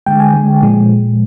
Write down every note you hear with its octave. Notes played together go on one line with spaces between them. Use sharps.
D3 G#3 G5
G#5
D3 G#3
A#2 F3 G#3